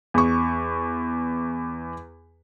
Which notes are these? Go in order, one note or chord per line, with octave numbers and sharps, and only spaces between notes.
E2 C#6